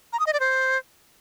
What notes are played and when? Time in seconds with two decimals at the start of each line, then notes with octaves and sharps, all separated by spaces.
0.13 A#5
0.20 D#6
0.26 D#5
0.33 D5
0.40 C5